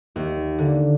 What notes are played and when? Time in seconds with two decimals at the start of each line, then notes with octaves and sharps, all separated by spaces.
0.16 D#2
0.58 D3